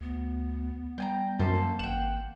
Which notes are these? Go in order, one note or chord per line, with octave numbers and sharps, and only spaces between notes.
D2 B3
G3 G5 G#5 A#5
F#2 C#4 A4 C5 A5
A#3
G#1 F#5 G5 E7